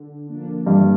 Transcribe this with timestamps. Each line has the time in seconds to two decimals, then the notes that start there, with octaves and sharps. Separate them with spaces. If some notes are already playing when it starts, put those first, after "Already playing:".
Already playing: D3
0.27 F3 A#3 D4
0.66 G2 D3